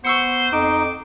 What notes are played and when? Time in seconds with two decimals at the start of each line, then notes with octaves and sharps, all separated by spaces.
0.05 B3 C5 C#6 E6 C#7
0.53 F2 D#4 D6